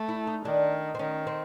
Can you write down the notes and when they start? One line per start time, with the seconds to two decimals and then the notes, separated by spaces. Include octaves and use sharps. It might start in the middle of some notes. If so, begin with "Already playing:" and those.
Already playing: A3
0.09 E4
0.27 D#4
0.45 D#3 D4
0.95 C4
0.99 D#3 C#4
1.27 C4